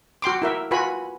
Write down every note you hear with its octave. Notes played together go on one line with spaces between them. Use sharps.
F#4 G5 C6 D6
E4 A#4 E5
F4 F#4 B4 G#5 B5